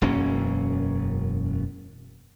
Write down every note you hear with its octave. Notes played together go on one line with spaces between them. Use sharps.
E1 F#2 A#3 C#4